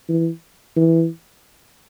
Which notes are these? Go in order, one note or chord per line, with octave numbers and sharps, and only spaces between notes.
E3
E3